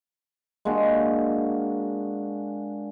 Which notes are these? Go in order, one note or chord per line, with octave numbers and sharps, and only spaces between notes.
G#3 A#3 D4 F#4